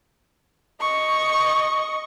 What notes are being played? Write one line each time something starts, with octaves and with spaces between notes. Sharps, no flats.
D#5 C#6